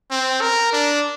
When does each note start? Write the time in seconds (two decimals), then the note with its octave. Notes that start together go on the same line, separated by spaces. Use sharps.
0.11 C4
0.41 A#4
0.73 D4